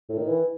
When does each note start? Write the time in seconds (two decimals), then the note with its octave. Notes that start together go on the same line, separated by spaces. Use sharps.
0.09 A2
0.18 D#3
0.28 E3